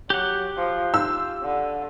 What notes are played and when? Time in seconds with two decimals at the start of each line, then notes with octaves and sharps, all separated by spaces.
0.10 F#3 G4 F#5
0.57 F3
0.94 F4 E6
1.43 D3